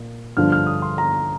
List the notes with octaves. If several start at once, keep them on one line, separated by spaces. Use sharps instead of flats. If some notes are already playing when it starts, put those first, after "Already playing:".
Already playing: A#2
G2 D3 F3 F6
F6
D#6
C6
A#5